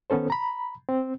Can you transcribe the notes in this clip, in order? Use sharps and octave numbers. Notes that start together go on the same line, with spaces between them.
D#3 B3 C#4 A4 C5
A#5 B5
C4